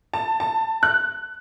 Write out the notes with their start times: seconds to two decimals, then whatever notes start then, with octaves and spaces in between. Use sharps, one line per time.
0.14 A5
0.40 A5
0.83 F#6